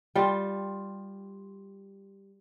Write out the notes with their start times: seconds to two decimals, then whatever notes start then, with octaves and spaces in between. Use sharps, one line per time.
0.15 G3 F4